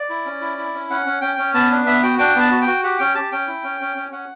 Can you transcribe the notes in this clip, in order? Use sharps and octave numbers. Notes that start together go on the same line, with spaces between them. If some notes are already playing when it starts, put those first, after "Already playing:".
Already playing: D5
E4
C#4
E4
E4
C#4
C#4 F#5
C#4
C#4 G5
C#4
B3 A5
D4
B3 E5
F#4 G5
D4 G5
B3 A5
F#4
G5
F#4
G4 F#5
C#4 G5
G4 A5
C#4 G5
E4
C#4
C#4
C#4
C#4 F#5